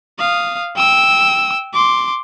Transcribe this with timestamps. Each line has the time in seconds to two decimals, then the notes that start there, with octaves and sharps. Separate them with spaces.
0.19 F5 D#6
0.76 G5 E6
1.73 C6 D6